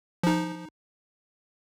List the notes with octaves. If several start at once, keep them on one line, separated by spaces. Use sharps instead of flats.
F3 D#4